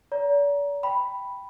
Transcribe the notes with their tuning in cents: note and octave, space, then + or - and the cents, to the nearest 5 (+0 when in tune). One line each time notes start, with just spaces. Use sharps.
D5 -45 A#5 +20
G5 +0 B5 +0